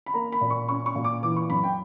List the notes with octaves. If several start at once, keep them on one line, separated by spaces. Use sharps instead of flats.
B5
A#3 A#5
B5
A#2
C#6
C#4 C#6
C#6
A#2
D6
E3 D6
C#6
F#2 B5
G5